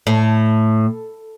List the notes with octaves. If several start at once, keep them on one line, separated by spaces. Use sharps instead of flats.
A2